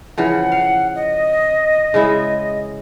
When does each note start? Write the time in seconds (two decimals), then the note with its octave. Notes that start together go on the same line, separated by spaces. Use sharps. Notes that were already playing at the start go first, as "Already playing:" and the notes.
0.18 C#3 E3 F3 F#5
0.52 F5
0.95 D#5
1.94 C#3 G#3 E4